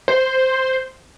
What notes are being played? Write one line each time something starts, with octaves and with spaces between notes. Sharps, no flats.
C5